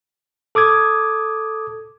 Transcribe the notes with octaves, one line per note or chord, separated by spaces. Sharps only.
A4 D6 D#6 G#6